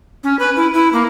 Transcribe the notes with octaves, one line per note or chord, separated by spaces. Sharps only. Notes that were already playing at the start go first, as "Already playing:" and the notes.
C#4
B4
E4
E4
A#3